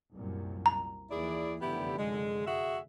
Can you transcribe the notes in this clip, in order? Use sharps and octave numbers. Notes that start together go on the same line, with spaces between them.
C2 F#2 A#2
A#5
D#2 E3 E4 G#4 D5
F1 F#2 D3 B3 E4 G4
G#3
F#4 G#4 E5